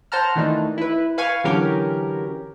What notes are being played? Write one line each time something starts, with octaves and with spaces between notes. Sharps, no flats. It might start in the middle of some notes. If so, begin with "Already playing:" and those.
C5 F#5 A5 A#5 F6
D#3 E3 A3 D4 D#4
E4 B4
B4 F5 G#5 C#6
D3 E3 F#3 C#4 G4 A#4